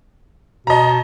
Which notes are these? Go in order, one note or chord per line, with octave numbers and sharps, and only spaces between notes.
B2 D#5 A5 A#5